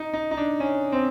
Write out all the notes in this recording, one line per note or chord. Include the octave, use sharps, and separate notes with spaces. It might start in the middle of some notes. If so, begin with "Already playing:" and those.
Already playing: D#4
D#4
D#4
D4
C#4
C4